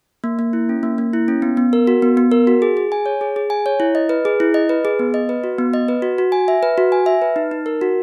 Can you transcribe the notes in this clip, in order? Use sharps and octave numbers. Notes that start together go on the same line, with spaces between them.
A#3
A#3
E4
C#4
A#3
A#3
E4
C#4
B3
B3
A#4
F#4
B3
B3
A#4
F#4
G#4
G#4
G#5
C#5
G#4
G#4
G#5
C#5
E4
D#5
B4
G#4
E4
D#5
B4
G#4
B3
D#5
B4
F#4
B3
D#5
B4
F#4
F#4
G#5
E5
B4
F#4
G#5
E5
B4
D#4
D#4
A#4
F#4